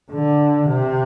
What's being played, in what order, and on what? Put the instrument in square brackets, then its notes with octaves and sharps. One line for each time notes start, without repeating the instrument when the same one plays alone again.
[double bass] D3
C3